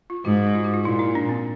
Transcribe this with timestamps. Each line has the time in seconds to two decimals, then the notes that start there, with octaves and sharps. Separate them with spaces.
0.10 F4
0.25 G#2 F#4
0.55 F4
0.64 F#4
0.74 F4
0.84 A#2 E4
0.99 D#4
1.15 D4
1.29 C4